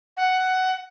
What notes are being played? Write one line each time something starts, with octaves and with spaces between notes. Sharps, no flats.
F#5